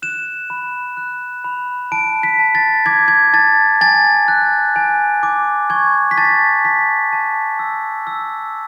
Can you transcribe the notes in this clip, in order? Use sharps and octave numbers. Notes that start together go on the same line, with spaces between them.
F#6 E7
B5
F#6
B5
A5 D7
B6
A5
A6
D6 G#6
G#6
A5 A6
G#5 A6
F#6
G#5
D6
C#6 G#6
B6
A5 A6
A5 B6
A5
E6
E6